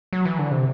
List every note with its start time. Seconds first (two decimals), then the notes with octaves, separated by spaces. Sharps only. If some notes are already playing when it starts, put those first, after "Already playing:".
0.13 F#3
0.25 E3
0.39 D3
0.51 C3